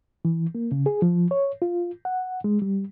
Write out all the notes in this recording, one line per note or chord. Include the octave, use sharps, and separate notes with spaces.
E3
A#3
C#3
G#4
F3
C#5
F4
F#5
G#3
G3